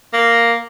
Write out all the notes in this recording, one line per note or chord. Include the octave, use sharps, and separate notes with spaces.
A#3